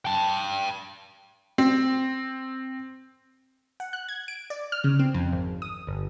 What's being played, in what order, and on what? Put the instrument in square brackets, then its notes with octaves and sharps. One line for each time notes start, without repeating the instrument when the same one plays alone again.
[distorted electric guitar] G5 A5
[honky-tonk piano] C4
[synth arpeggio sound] F#5
F#6
G#6
D7
D5
F6
C#3
C4
F2
G#1
D#6
G1